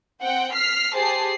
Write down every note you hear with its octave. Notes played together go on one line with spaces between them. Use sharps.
C4 F#5 G5
F6 B6 C7
G4 G#4 C5 A5 C7